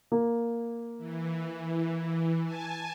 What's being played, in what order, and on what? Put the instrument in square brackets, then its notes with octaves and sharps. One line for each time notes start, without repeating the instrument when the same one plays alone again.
[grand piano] A#3
[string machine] E3
G#5 A5